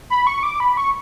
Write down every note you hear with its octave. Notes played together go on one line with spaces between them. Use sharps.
B5
C#6
D6
B5
C#6